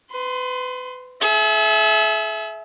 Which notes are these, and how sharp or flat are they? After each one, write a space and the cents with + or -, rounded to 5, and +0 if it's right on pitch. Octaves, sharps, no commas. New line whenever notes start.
B4 +30 C6 +0
G#4 +45 E5 +0